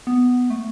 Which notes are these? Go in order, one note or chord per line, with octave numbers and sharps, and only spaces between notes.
B3
A3